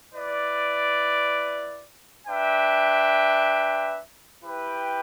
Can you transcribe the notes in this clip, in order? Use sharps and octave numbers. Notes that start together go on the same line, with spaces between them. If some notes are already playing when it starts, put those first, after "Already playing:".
E4 B4 D5
D4 B4 E5 G5
E4 G4 B4 G5